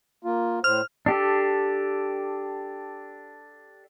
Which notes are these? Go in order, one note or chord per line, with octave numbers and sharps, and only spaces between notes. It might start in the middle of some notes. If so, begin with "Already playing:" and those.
A#3 F4
A2 C5 F6
D4 G4 A4